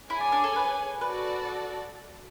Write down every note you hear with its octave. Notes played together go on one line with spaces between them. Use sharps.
E4 G#4 C#5 G#5
D4
D4
A4
B4
F#4 A4 B4 D5